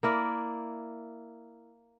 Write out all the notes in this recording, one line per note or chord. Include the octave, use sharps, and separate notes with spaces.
A#3 E4 A#4 D5